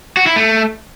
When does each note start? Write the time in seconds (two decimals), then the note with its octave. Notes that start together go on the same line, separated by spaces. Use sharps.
0.17 F#4
0.27 E4
0.36 A3